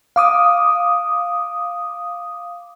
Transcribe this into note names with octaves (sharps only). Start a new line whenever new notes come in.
F5 D6 D#6